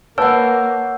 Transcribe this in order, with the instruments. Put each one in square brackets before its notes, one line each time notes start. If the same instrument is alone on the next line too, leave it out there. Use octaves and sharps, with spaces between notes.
[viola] A#3 [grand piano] B4 A5 E6 [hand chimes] C#5 F#5